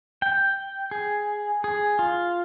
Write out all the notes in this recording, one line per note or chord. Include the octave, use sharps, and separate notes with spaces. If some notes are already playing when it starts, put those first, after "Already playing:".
G5
G#4
G#4
F4